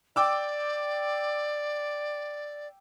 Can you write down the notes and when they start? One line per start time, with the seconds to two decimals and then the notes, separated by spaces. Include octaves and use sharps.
0.16 D5 G5 D6 E6